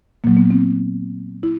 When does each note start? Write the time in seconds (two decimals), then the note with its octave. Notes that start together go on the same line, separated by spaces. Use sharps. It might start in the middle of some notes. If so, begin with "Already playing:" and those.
0.24 A#2 F#3 A#3
0.37 B3
0.50 C4
1.43 E4